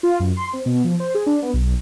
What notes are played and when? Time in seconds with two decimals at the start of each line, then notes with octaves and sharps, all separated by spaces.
0.03 F4
0.20 F#2
0.37 C6
0.53 C4
0.66 B2
0.84 F3
1.00 C5
1.15 G#4
1.26 D4
1.42 B3
1.53 B1